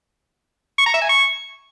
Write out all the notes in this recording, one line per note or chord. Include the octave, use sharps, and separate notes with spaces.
C#6
A#5
E5
G#5
C#6